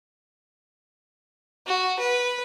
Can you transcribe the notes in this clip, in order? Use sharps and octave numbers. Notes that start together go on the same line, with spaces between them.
F#4
B4